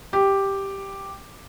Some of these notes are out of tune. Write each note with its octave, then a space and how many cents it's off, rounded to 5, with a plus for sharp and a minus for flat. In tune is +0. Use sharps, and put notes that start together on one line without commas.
G4 +0